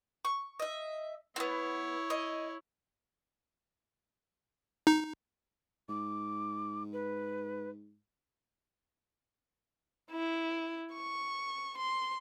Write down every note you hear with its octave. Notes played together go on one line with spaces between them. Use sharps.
C#6
D#5 E5
B3 C4 E4 C#5
D#5
D#4
G#2 D6
B4
E4
C#6
C6